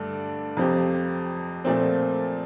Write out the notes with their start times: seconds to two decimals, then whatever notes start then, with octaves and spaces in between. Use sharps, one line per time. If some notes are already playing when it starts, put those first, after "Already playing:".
Already playing: G2 D3 A3 D4
0.57 F2 C3 F3 C4 G4
1.65 A#2 F3 A3 C4